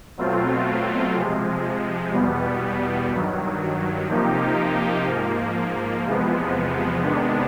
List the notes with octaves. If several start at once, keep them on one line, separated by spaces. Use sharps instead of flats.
B2 F#3 A3 C4 F4
C3 F3 G#3
E2 B2 G3 B3
G2 D#3 F#3
C3 F3 A#3 D#4 G4
G#2 F3 A#3
E2 C3 F3 G#3 B3
C3 D#3 G#3 B3 D4